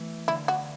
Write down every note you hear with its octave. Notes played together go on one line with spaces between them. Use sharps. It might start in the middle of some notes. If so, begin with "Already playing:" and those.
Already playing: E3 A3 B3
D3 E4
F#4